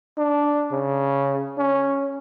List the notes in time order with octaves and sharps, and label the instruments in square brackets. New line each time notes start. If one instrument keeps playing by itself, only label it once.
[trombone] D4
C#3
C#4